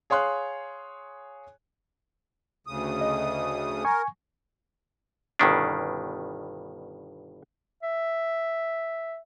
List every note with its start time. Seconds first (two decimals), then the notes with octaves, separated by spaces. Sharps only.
0.10 G#4 C#5 F5 C6 F#6
2.67 D2 C#3 D#6
3.01 D#5
3.85 A#4 G#5 C#6
5.39 G1 G2 B2 D#3 C#4 D4
7.83 E5